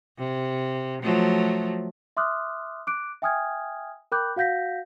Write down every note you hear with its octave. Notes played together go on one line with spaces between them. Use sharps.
C3
F3 F#3 A3
E5 C6 D6 D#6 F6 F#6
D6 F#6 D7
E5 G5 G#5 D#6 F6 G#6
A#4 G5 B5 D6 F#6 G6
F#4 F5 F#5 G6 A#6 B6